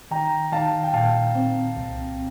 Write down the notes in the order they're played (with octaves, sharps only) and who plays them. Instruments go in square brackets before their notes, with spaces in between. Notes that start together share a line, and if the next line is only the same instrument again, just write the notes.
[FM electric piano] D#3 [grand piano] G5 A#5
[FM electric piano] D#3 [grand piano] F5 A5
[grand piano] G5
[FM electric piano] A#2 [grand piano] F5 A5
[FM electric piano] C4
C2